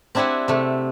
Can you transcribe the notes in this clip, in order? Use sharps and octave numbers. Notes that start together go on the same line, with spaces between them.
C4 D4 E4 G4 F#5 G#5
C3 A3